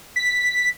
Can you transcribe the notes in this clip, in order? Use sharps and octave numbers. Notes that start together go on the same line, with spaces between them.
B6